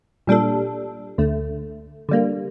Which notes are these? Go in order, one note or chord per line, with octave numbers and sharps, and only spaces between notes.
A#2 G3 D4 A4
D2 D3 A3
D3 G3 A#3